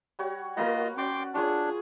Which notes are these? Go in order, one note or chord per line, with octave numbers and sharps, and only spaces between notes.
G3 F#4 C#5
A#3 F4 F#4 A#4 B4 D#5
C#4 F#4 D5 G5 C6 D6
D4 F4 G#4 C#5 C6 C#6